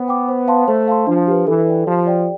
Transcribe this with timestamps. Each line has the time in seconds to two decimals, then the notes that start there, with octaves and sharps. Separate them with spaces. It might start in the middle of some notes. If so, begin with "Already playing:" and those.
Already playing: B3 C5
0.08 G5 D6
0.29 C5
0.48 F5 A5 C6
0.67 A3 C5
0.88 F5 A5 C6
1.07 F3 D4
1.27 G4 B4
1.47 E3 A4
1.67 D5 G5
1.87 F3 G4
2.07 D5 G5